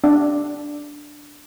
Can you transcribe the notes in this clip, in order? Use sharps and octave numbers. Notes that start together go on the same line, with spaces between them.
D4